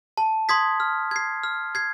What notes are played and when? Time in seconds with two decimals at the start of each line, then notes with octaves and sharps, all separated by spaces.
0.18 A5
0.49 C6 D#6 G#6 B6
0.80 F6
1.11 G#6 C7
1.43 F6
1.75 G#6 C7